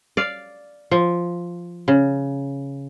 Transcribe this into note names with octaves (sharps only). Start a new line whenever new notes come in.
D5 F5
F3
C#3